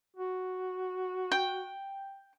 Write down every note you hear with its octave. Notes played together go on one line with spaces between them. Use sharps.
F#4
G5